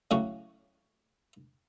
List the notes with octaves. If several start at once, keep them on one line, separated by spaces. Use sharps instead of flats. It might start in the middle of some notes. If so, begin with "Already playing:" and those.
A2 C#3 F#3 C#4 F#4